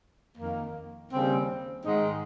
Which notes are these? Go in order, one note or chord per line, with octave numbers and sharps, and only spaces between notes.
F2 D#3 A#3
D#2 C#3 G3 C4
G#2 D#3 G#3 D#4